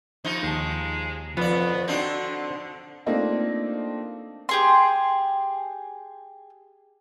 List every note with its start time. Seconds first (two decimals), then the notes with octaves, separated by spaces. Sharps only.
0.25 D#2 F3 D#4
0.43 D#2 G#3 A5
1.37 F2 F3 B3 B4 D5
1.88 D3 C4 D4 D#4 F#4 C5
3.06 A3 A#3 C4 D4 D#4 F4
4.49 G4 G#4 C6